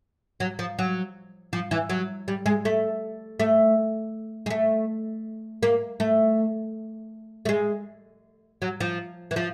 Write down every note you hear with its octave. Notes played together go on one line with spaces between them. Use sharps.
F#3
F3
F#3
F3
E3
F#3
G3
G#3
A3
A3
G#3
A3
A#3
A3
A3
G#3
F#3
F3
E3
F3